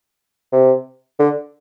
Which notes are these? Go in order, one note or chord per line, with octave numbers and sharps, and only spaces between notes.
C3
D3